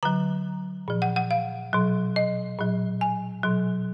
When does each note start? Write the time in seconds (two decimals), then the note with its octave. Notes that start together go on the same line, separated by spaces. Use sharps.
0.03 D3 F#3 A#5
0.88 A#2 F3
1.02 F#5
1.16 F#5
1.31 F5
1.73 B2 F#3
2.16 D#5
2.59 A#2 F#3
3.01 G#5
3.43 B2 F#3